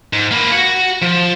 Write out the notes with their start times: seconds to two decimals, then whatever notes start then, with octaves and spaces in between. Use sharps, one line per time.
0.13 G#2
0.32 A#3 B4
0.53 F#4 F#5
1.02 F3